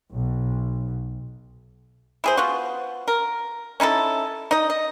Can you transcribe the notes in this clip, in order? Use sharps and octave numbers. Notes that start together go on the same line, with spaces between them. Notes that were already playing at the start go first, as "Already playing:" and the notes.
B1
E4 G#4 C5
B3 F4 F#4
A#4
C#4 D#4 E4 A4
D#4 D#5
D#5